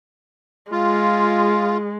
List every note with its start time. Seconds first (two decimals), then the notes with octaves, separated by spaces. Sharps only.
0.72 G#3 F4